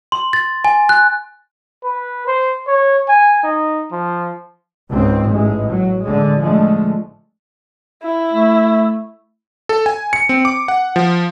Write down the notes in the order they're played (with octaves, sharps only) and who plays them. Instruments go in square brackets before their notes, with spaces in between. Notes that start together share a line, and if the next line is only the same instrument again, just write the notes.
[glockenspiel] C6
A6
G#5
F#6
[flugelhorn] B4
C5
C#5
G#5
D#4
F3
[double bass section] C#2 G#2 C4
A1 G#3
F#3
D3 G#3
D3 F3 G#3 A3
[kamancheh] E4
[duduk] A3
[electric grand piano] A4
G#5
C#7
C4
D6
F#5
F3